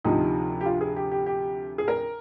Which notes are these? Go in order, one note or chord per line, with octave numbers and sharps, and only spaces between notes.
D2 C3 F3 D#4
G4
F4
G#4
G4
G4
G4
G#4
A#4